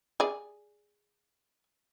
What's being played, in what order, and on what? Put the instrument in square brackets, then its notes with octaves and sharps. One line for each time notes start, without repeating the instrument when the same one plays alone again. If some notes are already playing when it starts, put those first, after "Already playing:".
[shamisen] G#4 D5